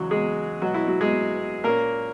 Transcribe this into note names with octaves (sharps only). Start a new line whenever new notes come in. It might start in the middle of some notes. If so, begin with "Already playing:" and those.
Already playing: E2 C#3 F#3 G#3 F#4
G#3 G#4
B2 F#3 G#3 B3 F#4
E4
F#3 F#4
G#3 G#4
A#2 A#3 C#4 A#4